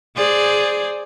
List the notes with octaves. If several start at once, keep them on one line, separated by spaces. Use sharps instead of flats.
G#4 C5 D5